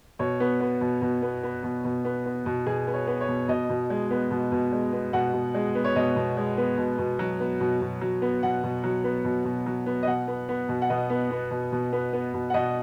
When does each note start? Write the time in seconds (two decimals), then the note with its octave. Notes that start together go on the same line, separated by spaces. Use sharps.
0.19 B2 C#5
0.40 B3
0.60 B3
0.81 B2
1.02 B2
1.22 B3
1.43 B3
1.63 B2
1.84 B2
2.05 B3
2.25 B3
2.46 B2
2.66 B2 G#4
2.87 B3
2.93 C#5
3.07 B3
3.21 C#5
3.28 B2
3.48 B2 D#5
3.70 B2
3.90 G#3
4.10 B3
4.31 B2
4.52 B2
4.72 G#3
4.93 B3
5.13 B2 F#5
5.33 B2
5.54 G#3
5.75 B3
5.84 C#5
5.96 B2 D#5
6.16 B2
6.37 G#3
6.57 B3
6.78 B2
6.98 B2
7.19 F#3
7.40 B3
7.60 B2
7.81 B2
8.01 F#3
8.22 B3
8.43 B2 F#5
8.63 B2
8.84 F#3
9.04 B3
9.25 B2
9.45 B2
9.66 F#3
9.86 B3
10.03 D#5
10.07 B2 F#5
10.27 B3
10.49 B3
10.69 B2
10.82 F#5
10.89 B2 D#5
11.10 B3
11.31 B3
11.51 B2
11.72 B2
11.93 B3
12.13 B3
12.34 B2
12.50 F#5
12.54 B2 D#5